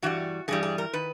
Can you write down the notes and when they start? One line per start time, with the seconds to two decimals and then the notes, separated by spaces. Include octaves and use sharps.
0.02 G2 E3 G3 F#4
0.48 G2 E3 G3 G#4
0.63 G#4
0.78 A#4
0.93 D#3 B4